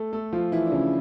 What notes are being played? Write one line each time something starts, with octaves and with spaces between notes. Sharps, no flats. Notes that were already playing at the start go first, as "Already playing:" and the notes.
Already playing: A3 A4
A3 A4
F3 F4
E3 E4
D4
C#3 C#4